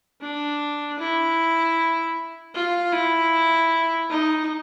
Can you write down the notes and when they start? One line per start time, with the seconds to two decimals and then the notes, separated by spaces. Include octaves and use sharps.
0.21 D4
0.99 E4
2.54 F4
2.93 E4
4.10 D#4